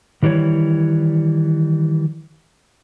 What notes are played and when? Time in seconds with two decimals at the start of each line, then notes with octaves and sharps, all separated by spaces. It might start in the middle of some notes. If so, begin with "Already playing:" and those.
0.23 D#3 E3 G3 E4 C#5